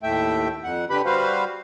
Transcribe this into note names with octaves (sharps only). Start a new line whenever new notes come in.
D#2 A2 A3 E5 G5
F2 F#5
D3 G4 B4 B5
G3 F#4 B4 C5 F5